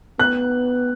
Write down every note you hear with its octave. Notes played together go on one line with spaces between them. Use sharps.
B3 F#6